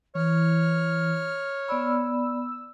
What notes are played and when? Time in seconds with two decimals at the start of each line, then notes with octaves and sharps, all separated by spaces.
0.15 E3 C#5 F6
1.68 B3 D5 B5 E6